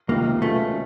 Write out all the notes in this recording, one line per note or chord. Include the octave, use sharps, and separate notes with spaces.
C#2 C3 D#3 A#3
B2 G#3 A3 C#4 F4